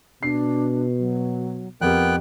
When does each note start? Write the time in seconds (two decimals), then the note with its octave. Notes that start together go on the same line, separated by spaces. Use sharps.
0.23 B2 D4 C7
0.98 F#3
1.81 F2 B3 G4 A#4 G5 F#6